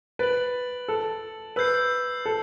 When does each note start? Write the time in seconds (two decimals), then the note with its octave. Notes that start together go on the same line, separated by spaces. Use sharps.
0.19 B4 A6 D7 F#7
0.88 A4
1.56 B4 E6 G6 C7
2.26 A4